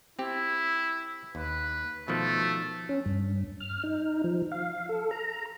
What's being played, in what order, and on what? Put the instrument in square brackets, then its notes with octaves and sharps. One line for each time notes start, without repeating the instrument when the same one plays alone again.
[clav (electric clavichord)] C4 G4 [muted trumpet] E4
[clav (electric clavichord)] D#2 [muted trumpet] B4
[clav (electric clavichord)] B2 D#3 F3 [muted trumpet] A3
[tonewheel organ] C#4
G2
F6
D#4
F3
F5
A4
A#5